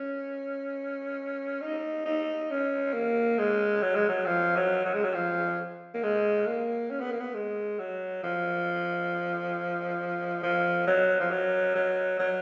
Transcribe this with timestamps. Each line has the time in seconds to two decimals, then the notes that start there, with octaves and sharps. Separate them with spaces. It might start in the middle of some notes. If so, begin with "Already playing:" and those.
Already playing: C#4
1.62 D#4
2.06 D#4
2.51 C#4
2.94 A#3
3.38 G#3
3.82 F#3
3.95 G#3
4.09 F#3
4.26 F3
4.56 F#3
4.86 F#3
4.94 G#3
5.04 F#3
5.14 F3
5.94 A#3
6.03 G#3
6.46 A#3
6.90 C#4
7.01 B3
7.11 A#3
7.20 B3
7.34 G#3
7.79 F#3
8.24 F3
10.43 F3
10.87 F#3
11.20 F3
11.31 F#3
11.75 F#3
12.19 F#3